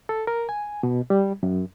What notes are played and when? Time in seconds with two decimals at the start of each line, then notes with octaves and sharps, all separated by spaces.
0.09 A4
0.27 A#4
0.49 G#5
0.83 B2
1.10 G3
1.43 F#2